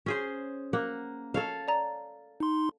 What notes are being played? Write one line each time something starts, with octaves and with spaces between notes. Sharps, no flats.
C#4 G#4 C5
A#3 F#5
A4 C#5 F5
D5 A#5
D#4 C6